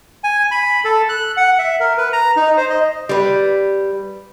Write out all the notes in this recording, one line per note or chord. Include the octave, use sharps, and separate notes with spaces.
G#5
B5
A4
F#6
F#5
E5
A#4
B4
A#5
D#4
C5
D#5
G3 B4